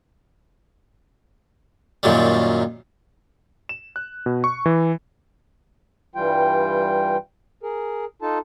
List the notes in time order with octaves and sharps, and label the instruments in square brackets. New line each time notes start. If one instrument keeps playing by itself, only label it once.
[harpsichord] F#2 A#2 D#3 F#3 G3
[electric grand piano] E7
F#6
B2
C#6
E3
[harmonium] G2 E3 G3 F4 G5
G#4 A#4
D#4 F4 A4 A5